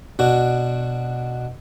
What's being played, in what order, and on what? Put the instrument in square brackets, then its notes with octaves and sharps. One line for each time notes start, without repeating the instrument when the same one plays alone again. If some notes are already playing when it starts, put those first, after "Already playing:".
[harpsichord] B2 D4 F#4